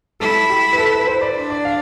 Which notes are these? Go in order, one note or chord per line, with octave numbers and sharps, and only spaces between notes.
E4 A4
G4
B4
A4
B4
C5
D5
D4
D5
F5